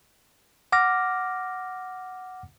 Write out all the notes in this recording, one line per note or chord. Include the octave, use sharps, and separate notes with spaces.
F#5 D6 F6 A#6